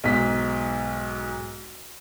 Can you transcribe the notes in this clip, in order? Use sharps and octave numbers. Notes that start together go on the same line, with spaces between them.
B1 G#2 B6